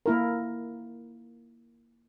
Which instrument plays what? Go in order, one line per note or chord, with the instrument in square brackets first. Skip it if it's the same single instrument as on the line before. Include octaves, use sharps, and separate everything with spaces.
[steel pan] A#3 E4 A#4